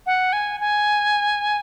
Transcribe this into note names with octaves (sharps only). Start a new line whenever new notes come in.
F#5
G#5
G#5